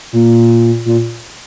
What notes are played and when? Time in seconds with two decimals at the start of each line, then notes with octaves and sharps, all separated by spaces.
0.13 A#2
0.85 A#2